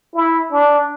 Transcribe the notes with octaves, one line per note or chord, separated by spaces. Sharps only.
E4
D4